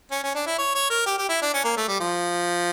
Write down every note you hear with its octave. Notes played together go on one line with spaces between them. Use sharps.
C#4
C#4
D4
E4
C#5
C#5
A#4
G4
G4
E4
D4
C#4
A#3
A3
G3
F3